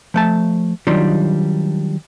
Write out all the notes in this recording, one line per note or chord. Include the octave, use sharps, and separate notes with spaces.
F3 A3 A5
D#3 F#3 G3 D4 D#4 F4